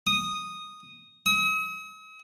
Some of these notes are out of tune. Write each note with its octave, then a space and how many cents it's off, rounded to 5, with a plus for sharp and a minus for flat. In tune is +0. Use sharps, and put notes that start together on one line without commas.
D#6 -5
D#6 +45